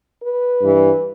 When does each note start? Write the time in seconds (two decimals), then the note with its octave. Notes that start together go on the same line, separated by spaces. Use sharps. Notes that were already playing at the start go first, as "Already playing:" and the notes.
0.21 B4
0.62 G2 E3